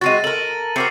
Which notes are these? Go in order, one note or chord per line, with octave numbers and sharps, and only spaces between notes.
G#3 C4 F#4 A6 A#6 D#7
A4 A#4 F#7
C4 F#4 A#4 D6 C7 C#7